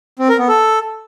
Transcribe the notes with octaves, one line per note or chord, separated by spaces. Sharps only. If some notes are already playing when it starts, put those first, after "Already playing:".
C4
A#4
B3
A4